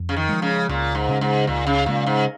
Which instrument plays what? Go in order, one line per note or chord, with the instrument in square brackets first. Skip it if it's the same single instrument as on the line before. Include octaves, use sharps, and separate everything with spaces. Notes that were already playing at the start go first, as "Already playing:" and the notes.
Already playing: [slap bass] F2
[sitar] C#3
D#3
[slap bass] F3 G#3
[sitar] C#3
[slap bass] C#2 [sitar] A#2
[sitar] G#2
[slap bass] C#3 G#3 C#4
[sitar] G#2
[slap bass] C#2 [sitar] A#2
[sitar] C#3
[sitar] A#2 [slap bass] C#3 G#3 C#4
[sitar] G#2